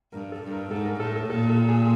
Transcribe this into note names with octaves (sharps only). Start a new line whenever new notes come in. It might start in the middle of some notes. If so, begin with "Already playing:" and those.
G2 A#4
A4
G2
A#4
G#2 A4
A#4
A2 A4
A4
A#2 A4
A4
G#4